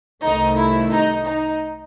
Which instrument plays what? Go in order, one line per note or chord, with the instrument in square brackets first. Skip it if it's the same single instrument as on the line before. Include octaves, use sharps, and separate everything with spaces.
[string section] C2 C3 D#3 A3 D#4
E4
D#4
D#4